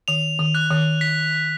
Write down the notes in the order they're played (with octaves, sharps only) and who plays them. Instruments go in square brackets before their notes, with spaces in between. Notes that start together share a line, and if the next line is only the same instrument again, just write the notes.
[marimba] D#3 [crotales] F7
[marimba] D#3
[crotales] F#6
[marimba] D#3
[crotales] B6